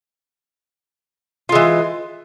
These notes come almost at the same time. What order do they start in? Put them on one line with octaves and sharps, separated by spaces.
F4 G#3 E3